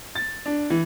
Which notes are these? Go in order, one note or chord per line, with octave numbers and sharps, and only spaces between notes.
A6
D4
E3